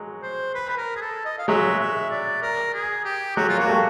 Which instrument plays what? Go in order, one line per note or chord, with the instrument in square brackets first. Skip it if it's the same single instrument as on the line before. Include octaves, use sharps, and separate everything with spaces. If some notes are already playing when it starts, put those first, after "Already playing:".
Already playing: [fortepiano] F#3 G#3
[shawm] C5
B4
B4
A#4
G#4
A4
D#5
F5
[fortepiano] F#3 G#3 [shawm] E5
[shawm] E5
D5
A#4
G#4
G4
[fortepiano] F#3 G#3 [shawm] F#4
[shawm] F4
[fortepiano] A#3 [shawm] F#4
[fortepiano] G3 A3